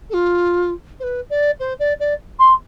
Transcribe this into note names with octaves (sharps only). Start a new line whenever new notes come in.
A4
F4
C5
B4
D5
C5
D5
D5
C6